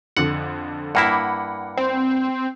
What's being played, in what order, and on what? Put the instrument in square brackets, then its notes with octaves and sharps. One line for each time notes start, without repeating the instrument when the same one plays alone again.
[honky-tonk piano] F2 D3 [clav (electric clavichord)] F#5
[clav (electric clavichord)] G2 A#3 E4 [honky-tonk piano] F#5 B5 D6
[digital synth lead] C4